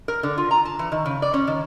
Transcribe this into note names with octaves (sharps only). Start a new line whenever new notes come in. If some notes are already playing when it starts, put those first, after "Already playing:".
A#4
D3
F4
A#5
A5
E3
D#3
C#3
D5
C#4
D#3